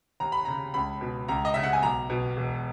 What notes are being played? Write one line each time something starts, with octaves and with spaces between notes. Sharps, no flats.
D#2 A#5
B5
C#3 A#5
C#2 B5
B2
C#2 A#5
D#5
C#3 E5
F#5
G#5
B1 A#5
B2
E1